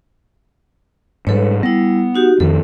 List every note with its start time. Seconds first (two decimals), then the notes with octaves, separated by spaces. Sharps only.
1.27 G#2 G3 A4 B4 C#5
1.63 G3 B3 E4
2.15 D#4 F#4 G4
2.40 F2 D#3 A4